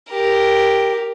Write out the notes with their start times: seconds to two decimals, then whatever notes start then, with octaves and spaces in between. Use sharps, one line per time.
0.10 G4 A#4